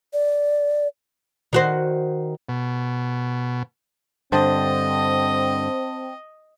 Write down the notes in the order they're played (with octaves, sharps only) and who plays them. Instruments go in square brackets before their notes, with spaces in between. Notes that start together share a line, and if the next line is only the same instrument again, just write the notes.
[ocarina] D5
[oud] D#3 F#4 C5
[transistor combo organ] B2
[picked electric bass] G2 D3 [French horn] C4 [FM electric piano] C5 G5 A5 [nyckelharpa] D#5